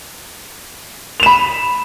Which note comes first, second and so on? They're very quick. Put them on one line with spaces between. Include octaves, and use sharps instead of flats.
F7 E7 B5